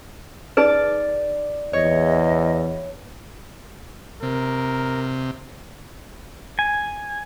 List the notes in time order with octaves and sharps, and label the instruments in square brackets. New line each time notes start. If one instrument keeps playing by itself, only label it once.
[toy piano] D#4 G#4 B4 [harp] D5 A6 D7
[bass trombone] E2 [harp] C#5 [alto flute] D#5
[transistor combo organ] C3 [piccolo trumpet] A#4
[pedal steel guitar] G#5